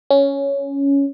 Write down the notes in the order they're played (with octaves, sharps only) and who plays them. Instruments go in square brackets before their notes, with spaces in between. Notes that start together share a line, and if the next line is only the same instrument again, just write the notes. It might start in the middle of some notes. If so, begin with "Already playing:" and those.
[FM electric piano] C#4